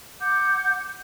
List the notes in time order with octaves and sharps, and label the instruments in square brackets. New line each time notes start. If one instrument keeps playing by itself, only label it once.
[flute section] F#5 D6 G6